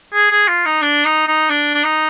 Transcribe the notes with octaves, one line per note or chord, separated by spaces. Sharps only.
G#4
G#4
F4
D#4
D4
D#4
D#4
D4
D4
D#4